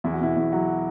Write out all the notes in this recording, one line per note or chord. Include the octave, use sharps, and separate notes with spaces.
E2 E4
F#4
B2 E4
E2
F#3 F#4